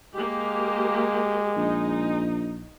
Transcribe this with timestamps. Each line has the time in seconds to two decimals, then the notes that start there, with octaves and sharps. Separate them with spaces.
0.14 G#3 A#3 G4
1.57 A#1 D#4